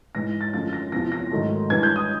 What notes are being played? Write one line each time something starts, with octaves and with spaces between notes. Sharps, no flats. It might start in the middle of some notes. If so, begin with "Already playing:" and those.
G#2 E3 G#3 A#6
A6
F#2 D3 F3 G#3 A6
A#6
E2 C3 F3 A#6
A#6
G#2 D#3 F#3 A3
G2 E3 G#3 G#6
G6
D#6